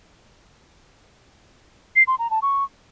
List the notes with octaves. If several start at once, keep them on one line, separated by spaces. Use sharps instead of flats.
C7
C6
A#5
A5
C#6